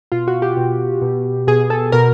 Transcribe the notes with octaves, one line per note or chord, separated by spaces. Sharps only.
B2 F4
F#4
G4
B2
B2
B2 G#4
A4
B2 A#4